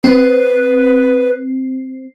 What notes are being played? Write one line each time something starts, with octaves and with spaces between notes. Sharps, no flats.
C4 B4